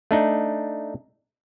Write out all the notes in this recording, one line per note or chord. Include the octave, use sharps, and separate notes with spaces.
A3 D4 D#4